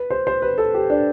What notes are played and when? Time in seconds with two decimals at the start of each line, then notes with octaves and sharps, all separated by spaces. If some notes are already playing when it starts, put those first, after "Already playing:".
Already playing: B4
0.10 C5
0.27 C5
0.42 B4
0.58 A4
0.74 G4
0.90 D4